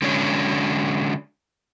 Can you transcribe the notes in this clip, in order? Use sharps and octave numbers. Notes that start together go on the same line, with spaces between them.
D3 F#3 G#3 C#4 D4 C#5